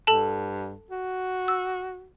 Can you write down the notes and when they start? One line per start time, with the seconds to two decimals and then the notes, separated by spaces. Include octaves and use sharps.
0.07 G2 A4 A5
0.91 F#4
1.48 E6